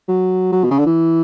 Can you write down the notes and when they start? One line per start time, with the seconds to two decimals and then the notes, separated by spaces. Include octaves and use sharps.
0.08 F#3
0.52 F#3
0.64 B2
0.71 C#3
0.79 D3
0.86 E3